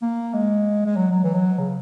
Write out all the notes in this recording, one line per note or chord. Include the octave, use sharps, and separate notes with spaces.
A#3
G#3
G#3
F#3
F#3
E3
F#3
C#3